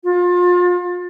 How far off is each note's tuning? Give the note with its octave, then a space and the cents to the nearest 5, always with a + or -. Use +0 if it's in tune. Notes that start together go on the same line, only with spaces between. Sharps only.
F4 +30